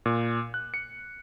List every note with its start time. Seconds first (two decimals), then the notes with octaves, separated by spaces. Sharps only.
0.06 A#2
0.54 F#6
0.74 C#7